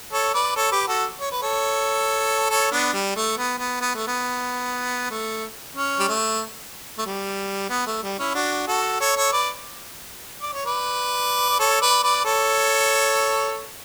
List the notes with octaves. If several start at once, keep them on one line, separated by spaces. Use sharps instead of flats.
A4 C#5
B4 D5
A4 C#5
G4 B4
F#4 A4
C#5
B4
A4 C#5
A4 C#5
B3 D4
G3
A3
B3
B3
B3
A3
B3
A3
C#4
G3
A3
A3
G3
B3
A3
G3
C#4 E4
D4 F#4
F#4 A4
A4 C#5
A4 C#5
B4 D5
D5
C#5
B4 D5
D5
A4 C#5
B4 D5
B4 D5
A4 C#5